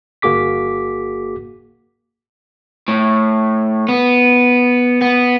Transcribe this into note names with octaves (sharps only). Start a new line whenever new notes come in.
G1 A#3 F#4 G#4 D6 B6
A2
B3
B3